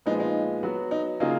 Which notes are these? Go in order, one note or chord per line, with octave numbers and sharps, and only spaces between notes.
A#2 F3 G#3 B3 D#4
D#4
F#3 B3 F#4
D#4
C#3 F#3 A#3 D#4 F4 G#4